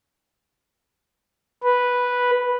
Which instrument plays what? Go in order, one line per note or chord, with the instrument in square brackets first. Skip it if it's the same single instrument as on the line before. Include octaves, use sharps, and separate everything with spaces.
[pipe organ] B4